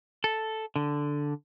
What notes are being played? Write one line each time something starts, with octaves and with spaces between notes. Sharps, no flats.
A4
D3